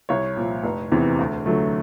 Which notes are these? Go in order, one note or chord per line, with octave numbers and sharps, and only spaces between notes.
C2 C#5
A#2 F3
F1
E2 C3 E3
D2
D3 F#3 A3